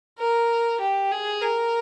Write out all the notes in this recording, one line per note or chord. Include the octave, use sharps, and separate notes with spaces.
A#4
G4
G#4
A#4